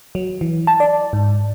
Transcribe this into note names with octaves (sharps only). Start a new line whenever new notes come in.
F#3
E3
A5
D5
G#2